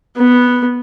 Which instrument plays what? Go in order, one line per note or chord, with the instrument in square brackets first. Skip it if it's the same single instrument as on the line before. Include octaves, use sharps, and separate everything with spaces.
[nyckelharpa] B3